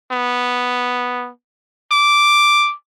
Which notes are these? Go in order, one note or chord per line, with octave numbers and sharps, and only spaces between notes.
B3
D6